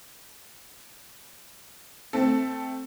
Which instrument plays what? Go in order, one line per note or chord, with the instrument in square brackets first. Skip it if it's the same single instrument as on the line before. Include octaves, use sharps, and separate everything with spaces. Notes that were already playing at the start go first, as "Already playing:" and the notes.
[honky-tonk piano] A3 C4 A4